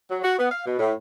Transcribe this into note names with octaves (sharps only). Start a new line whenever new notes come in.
F#3
F#4
B3
F5
B2
A2